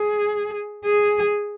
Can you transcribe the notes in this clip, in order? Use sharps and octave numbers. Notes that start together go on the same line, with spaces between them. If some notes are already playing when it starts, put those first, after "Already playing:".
Already playing: G#4
G#4